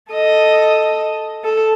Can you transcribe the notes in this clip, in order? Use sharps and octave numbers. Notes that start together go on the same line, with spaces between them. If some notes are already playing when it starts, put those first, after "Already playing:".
A4 D#5
A4